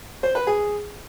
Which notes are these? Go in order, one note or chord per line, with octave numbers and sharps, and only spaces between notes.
C5
B4
G#4